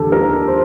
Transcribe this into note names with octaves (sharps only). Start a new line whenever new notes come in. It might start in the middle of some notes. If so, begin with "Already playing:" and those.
Already playing: D#2 D3 F3 G4 A4
A#4
C5